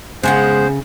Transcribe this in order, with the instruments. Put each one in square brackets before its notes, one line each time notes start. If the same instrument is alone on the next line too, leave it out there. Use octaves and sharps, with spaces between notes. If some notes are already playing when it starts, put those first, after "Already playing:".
[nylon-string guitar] C#3 [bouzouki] G#3 B3 F#5 [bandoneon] C5